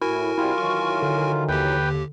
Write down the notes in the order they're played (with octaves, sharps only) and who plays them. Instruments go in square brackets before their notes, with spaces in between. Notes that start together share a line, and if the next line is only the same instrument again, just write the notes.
[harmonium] A2 [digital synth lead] E4 [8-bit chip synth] F#4 A#4 G#5
[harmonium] C3 G3 G4 [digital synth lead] E4 [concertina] F4
[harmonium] D#3 E3 F#3 [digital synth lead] C#6
[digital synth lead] D3
[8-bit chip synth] D#2 G4 [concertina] B4 G5